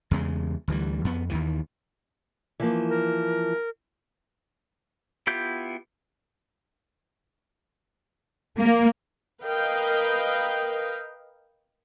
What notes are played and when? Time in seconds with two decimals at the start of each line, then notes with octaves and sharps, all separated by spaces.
0.11 E2 C#3 G#3
0.68 D2 E3 G3
1.05 F2 B3
1.29 D#2 D#3 E3
2.60 E3 F3 A#3
2.89 A#4
5.27 B3 E4 F4 G4 G6
8.60 A#3
9.43 A#4 B4 D#5 F5 G5